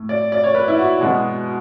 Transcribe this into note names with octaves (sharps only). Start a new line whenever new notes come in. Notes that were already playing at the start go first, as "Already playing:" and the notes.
Already playing: A2
D5
D5
C#5
B4
E4
F#4
B2 G#3 B3 F#4